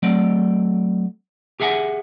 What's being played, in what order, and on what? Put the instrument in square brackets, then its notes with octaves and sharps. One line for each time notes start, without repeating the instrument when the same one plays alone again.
[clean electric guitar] F#3 A3 C4 D5
G4 G#4 E5 F#5 G#5